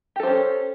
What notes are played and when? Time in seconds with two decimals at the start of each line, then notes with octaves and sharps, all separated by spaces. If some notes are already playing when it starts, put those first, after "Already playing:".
0.16 G4
0.20 A4
0.23 C5
0.27 C#4